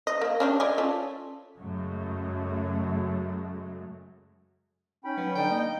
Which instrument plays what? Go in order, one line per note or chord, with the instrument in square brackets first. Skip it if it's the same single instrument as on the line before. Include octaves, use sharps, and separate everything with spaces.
[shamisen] D#5
A#3
C#4 D4 G4
D5 D#5 G#5
C#4 F4 A4
[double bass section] F#2 C#3 F#3 G#3 A3
[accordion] C#4 G5 B5 [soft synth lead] D#4
[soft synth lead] F#3 [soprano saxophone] B3
[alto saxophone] D3 [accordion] D#4 [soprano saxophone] G5 [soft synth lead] G6
[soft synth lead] A#3 [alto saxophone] D#5